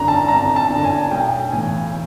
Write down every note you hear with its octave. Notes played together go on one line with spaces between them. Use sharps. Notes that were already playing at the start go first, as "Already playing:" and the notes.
Already playing: G#1 F#2 D3 A#5
A5
G#1 A#5
A5
F#2 D3
G#5
B1 G5
A2 E3 G#5